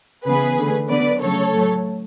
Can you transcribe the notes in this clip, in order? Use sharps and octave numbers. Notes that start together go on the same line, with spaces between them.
C#3 E3 B3 G#4 B4
D3 A3
D3 F#3 B3 B4 D5
C#3 F#3 A3 A4 C#5
A2 F#3 A3